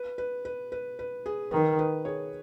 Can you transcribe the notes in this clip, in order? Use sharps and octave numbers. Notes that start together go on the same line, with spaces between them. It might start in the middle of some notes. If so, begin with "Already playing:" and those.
Already playing: B4
B4
B4
B4
B4
G#4
D#3 B4
B4
G#4 C#5